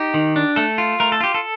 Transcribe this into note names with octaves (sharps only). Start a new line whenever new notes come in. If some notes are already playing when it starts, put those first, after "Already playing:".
Already playing: D#4 G4
D#3
D4
A3 A4
F4
A3 A#4
A4
F4 G4
A4